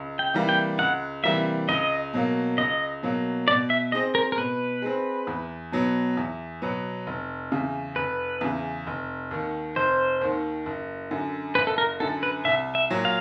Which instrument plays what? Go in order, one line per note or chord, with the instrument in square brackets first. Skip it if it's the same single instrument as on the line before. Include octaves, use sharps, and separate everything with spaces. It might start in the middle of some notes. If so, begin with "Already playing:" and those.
Already playing: [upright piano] C#2
[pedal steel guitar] G5
[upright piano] C3 E3 G3 A#3
[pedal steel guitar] G5
[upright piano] C#2 [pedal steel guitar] F#5
[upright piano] C3 E3 G3 A#3 [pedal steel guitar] E5
[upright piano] C#2 [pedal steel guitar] D#5
[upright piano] B2 F#3 A#3
[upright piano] C#2 [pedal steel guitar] D#5
[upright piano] B2 F#3 A#3
[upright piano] B2 [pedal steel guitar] D5
[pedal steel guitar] E5
[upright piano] G#3 C4 [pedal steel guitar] D#5
[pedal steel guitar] A#4
A#4
[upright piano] B2 [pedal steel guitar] B4
[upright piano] G#3 C4
E2
B2 F#3 B3
E2
B2 F#3 B3
F1
E2 C#3
[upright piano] F1 [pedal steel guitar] B4
[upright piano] E2 C#3
F1
D#2 D#3
[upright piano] F1 [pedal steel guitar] C5
[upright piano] D#2 D#3
F#1
F#2 D3
[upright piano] F#1 [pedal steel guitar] B4
[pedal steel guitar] A4
A#4
[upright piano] F#2 D3 [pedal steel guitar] A4
[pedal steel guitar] B4
[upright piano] C2 [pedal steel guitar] E5
[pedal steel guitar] E5
[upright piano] A#2 F#3
[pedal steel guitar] F5